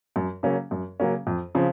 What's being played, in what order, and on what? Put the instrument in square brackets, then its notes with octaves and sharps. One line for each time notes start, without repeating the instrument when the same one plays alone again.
[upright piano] F#2
C#3 F#3 A#3 C#4
F#2
C#3 F#3 A#3 C#4
F2
C#3 F3 C4